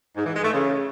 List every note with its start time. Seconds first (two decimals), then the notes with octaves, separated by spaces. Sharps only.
0.16 G#2
0.25 E3
0.34 G#3
0.43 A3
0.52 C#3